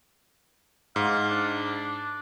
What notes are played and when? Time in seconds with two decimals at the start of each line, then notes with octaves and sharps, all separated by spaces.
0.96 G#2 F5
1.30 D4